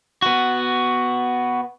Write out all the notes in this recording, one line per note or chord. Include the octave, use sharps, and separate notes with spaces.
B3 F#4